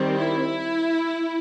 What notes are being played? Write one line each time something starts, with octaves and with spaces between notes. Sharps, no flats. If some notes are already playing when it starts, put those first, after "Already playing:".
Already playing: D#3 G3 C4
E4